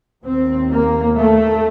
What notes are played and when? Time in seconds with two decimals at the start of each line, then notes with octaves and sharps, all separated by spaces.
0.23 D#2 C4
0.70 A#3
1.16 A3